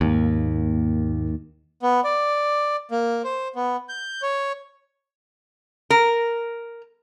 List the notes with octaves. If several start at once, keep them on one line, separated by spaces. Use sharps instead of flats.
D#2 G#2 A#3
B3
D5
A#3
C5
B3
G6
C#5
A#4